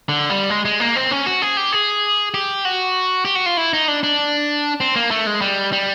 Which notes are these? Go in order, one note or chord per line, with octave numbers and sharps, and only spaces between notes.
D3
G3
G#3
G#3
A#3
C4
C#4
F#4
G#4
G4
G#4
G4
F#4
G4
F#4
F4
E4
D#4
D4
D4
C4
A#3
A3
G#3
G3
G3